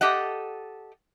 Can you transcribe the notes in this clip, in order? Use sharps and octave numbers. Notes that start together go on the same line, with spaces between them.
G4 A4 D#5 F#5